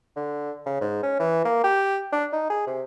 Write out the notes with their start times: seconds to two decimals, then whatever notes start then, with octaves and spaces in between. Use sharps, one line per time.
0.17 D3
0.66 C#3
0.81 G#2
1.03 C#4
1.20 E3
1.45 A#3
1.64 G4
2.12 D4
2.33 D#4
2.50 G#4
2.67 C3